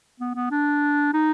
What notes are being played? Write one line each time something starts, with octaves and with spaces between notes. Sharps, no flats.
B3
B3
D4
D#4